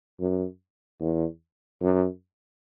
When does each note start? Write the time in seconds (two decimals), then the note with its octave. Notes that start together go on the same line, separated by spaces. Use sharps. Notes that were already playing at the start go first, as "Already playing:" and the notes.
0.20 F#2
1.01 E2
1.81 F#2